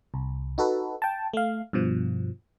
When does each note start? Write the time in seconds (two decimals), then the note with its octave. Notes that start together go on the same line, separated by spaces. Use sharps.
0.14 C2
0.58 D#4 F#4 A4 B4
1.02 G5 A5
1.33 A3 F5
1.73 G2 B2 F3